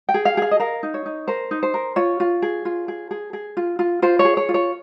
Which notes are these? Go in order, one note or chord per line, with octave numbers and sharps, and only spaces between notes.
G5
G#4
F5
G#4 F5
D#5
A#4 F5
D#4
C#5
D#4
A#4 C5
D#4
C5
A#4
F4 C#5
F4
G#4
F4
G#4
G#4
G#4
F4
F4
F4 C5
C#5
G#4
C#5
F4
C#5